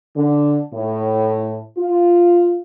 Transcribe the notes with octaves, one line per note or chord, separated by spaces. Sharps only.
D3
A2
F4